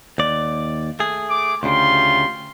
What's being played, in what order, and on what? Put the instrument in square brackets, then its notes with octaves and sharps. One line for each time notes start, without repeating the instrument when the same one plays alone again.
[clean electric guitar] D#2 D5
A3 G#4
[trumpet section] D6
[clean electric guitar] D2 C#3 [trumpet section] F4 G4 C6